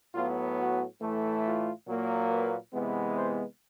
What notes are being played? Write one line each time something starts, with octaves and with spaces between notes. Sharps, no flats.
A2 F#3 B3 F4
F#4
A2 E3 A3
F4
A#2 F#3 A#3
B4
C3 E3 G#3 B3
C5